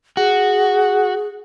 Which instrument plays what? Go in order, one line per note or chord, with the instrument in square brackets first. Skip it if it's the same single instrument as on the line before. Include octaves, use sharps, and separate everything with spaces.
[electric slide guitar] F#4 [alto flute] G#4